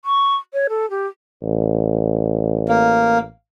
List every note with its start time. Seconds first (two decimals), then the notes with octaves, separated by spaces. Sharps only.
0.05 C#6
0.53 C#5
0.69 A4
0.90 G4
1.43 A1
2.69 A#3